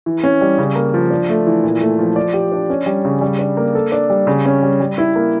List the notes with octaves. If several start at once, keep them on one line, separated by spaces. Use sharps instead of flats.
E3
C#4
G3
C#3
A#3
F3
D4
A3
E3
A#2
A3
F3
D5
G4
D4
C#4
G3
C#3
G3
D4
A#3
A4
D4
G3
C#3
C#4
G3
G3
E4
A#3